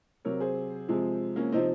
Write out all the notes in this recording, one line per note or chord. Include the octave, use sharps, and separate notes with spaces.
C3 F#3 A#4 C#5
G#4 C5
C3 F3 G#3
A#3 C#4
C3 F3 C4 D#4